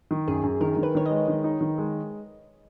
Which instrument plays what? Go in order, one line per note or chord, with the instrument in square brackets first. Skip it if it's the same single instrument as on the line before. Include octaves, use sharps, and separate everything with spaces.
[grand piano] D#3
[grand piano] F#2 [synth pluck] G#4
[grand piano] F#2
[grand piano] D#3 [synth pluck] A#4
[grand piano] D#3
[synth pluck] B4
[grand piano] D#3 [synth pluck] C#5
[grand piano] G#3 [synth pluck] D#5
[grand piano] D#3
D#4
D#3
G#3